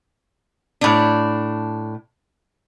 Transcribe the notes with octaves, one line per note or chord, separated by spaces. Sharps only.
A2 D4